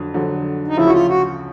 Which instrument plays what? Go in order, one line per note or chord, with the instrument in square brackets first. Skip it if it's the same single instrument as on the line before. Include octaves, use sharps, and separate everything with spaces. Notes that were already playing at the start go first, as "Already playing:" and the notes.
Already playing: [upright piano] F2 D3 F#3
F2 D3 F#3
[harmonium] D#4
[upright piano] D2 C#3 F3 [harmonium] E4
[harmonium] F#4
F4
F#4